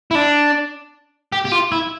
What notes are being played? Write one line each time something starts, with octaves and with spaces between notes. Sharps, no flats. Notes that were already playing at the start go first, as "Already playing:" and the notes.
E4
D4
G4
G4
F4
E4